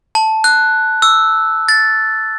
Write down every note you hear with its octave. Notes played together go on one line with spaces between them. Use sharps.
A5
F#6
E6
A6